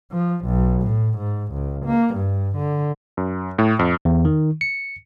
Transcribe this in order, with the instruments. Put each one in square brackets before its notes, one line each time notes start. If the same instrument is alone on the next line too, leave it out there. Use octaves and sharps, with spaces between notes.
[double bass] F3
B1
A2
G#2
C#2
A#3
G2
D3
[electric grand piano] F#2
A2
F2
[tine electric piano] E2
D#3
C#7